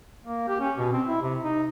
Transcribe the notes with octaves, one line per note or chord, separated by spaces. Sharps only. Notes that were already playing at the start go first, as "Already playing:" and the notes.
A#3
G4
C#4
B2
C4
E4
C3
D#4